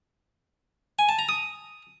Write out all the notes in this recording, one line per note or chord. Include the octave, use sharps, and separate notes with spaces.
G#5
A5
A#5
D#6